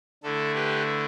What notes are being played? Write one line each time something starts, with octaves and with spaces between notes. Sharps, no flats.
D3 A3 E4 A4
G4 B4